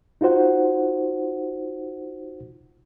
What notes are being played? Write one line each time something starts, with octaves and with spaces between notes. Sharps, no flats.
D#4 F4 F#4 C5 F#5